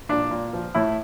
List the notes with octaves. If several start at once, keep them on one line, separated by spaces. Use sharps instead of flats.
A#2 D4
A#2
F3
A2 E4